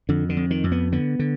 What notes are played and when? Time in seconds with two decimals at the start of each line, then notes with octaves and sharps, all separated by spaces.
0.09 F2 D3
0.29 D3
0.37 F2
0.51 D#3
0.64 F2
0.72 B3
0.92 D3 B3
1.19 D3